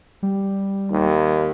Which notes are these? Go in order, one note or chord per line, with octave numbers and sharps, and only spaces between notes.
G3
D#2